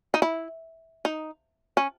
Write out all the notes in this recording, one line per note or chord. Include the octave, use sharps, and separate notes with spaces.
D#4
E4
D#4
C#4